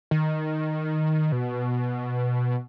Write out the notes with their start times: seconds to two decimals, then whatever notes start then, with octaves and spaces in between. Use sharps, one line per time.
0.11 D#3
1.32 B2